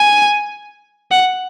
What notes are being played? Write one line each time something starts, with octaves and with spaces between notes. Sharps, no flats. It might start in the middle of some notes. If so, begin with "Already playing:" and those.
Already playing: G#5
F#5